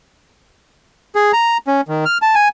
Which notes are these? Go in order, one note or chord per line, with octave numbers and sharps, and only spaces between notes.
G#4
A#5
C#4
D#3
F6
A5
G#5